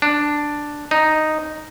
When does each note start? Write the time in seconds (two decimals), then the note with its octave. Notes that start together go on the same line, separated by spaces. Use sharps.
0.02 D4
0.91 D#4